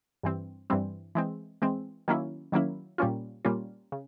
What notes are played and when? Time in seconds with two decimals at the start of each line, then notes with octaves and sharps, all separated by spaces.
0.23 G2 E3 G3 C4
0.70 G2 E3 G3 C4
1.15 E3 G#3 C4
1.62 E3 G#3 C4
2.08 D#3 F#3 A#3 C#4 E4
2.52 D#3 F#3 A#3 C#4 E4
2.98 A#2 G3 A#3 C#4 F4
3.45 A#2 G3 A#3 C#4 F4
3.92 C#3